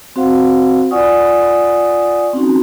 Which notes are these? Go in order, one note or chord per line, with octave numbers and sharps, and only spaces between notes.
C4 F#4 C5 F5 F#5
F4 D5 F#5 G#5 C#6 D#6
C4 C#4 D#4 F#4